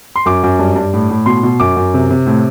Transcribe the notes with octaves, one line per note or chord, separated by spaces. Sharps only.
C6
F#2 D6
F#2
G2
G2
A2
A2
B2 C6
B2
F#2 D6
F#2
C3
C3
A2